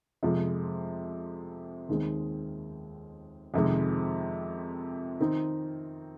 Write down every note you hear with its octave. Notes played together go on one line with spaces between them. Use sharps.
F2 C3 F3 G#3
D#2 D#3 G#3 C4
F2 C3 D#3 G#3
D#3 C4 D#4